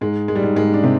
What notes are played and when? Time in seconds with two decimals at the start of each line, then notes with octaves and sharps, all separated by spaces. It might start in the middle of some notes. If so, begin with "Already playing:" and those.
0.01 G#2 G#3
0.28 G#3
0.35 G3
0.43 G#2 G#3
0.56 G#2 G#3
0.74 D4
0.83 C3 C4